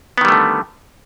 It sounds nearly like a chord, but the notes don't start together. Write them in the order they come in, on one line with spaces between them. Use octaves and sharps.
B3 D#3 G3 A3 D3